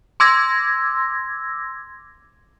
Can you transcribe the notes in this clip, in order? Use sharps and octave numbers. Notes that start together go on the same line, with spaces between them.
C6 D6 E6 G#6 A#6